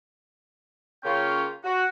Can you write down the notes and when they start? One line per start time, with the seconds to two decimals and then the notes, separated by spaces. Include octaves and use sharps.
1.04 C#3 A#3 C#4 F4 C#5 G5
1.64 F#4